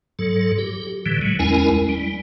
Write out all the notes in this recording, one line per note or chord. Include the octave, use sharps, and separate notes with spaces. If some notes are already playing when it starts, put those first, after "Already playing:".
G#2 F#3 A4
G4
A2 D3 E3 G3
F#3 G#3
E2 G#3 C#4 E4 A#4 G#5
G3